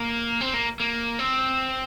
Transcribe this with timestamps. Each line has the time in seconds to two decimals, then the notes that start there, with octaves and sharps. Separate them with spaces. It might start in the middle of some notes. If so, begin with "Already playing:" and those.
Already playing: A#3
0.41 C4
0.54 A#3
0.80 A#3
1.19 C4